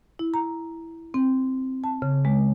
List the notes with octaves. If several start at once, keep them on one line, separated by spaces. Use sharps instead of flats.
E4
A#5
C4
A5
C#3
G#3